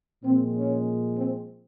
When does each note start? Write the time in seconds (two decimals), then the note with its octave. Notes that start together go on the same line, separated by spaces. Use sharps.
0.24 A#2 F3 G#3 C4
0.55 C#4
1.16 C4